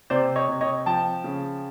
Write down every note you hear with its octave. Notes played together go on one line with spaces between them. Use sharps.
C3 C5 D5
C#5 D#5
C3
C#5 D#5
F3 G5 A5
C#3